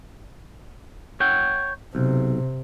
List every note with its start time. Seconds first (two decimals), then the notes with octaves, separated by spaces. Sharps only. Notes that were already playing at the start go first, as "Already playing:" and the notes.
1.20 C#5 F#5 G5
1.95 B1 C3